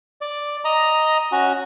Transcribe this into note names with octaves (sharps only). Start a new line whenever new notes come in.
D5
D#5 A#5
C#4 F#4